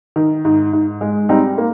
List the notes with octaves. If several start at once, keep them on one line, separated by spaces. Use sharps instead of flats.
D#3
G#2
G#2
G#3
G3 C4 D#4
A#3